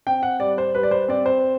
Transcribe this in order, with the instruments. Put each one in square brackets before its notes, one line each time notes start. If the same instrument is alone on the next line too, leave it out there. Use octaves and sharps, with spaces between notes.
[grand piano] C4 G5
F#5
G3 D5
C5
G3 B4
D5
C5
C4 D5
C5